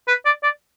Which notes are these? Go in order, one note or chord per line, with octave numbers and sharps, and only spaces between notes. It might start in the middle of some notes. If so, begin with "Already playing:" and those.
B4
D5
D5